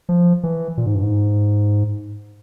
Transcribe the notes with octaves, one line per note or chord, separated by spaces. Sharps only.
F3
E3
A#2
G#2
G2
G#2